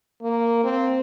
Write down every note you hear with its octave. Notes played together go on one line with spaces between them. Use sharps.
A#3
C4